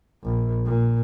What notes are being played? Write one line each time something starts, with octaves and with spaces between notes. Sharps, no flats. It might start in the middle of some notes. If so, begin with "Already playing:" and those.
A#1
A#2